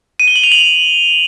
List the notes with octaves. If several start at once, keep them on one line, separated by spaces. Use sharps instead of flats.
D#7
G7
F#7
F7
F#7